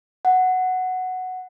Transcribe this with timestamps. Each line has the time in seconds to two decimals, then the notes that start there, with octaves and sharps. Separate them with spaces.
0.25 F#5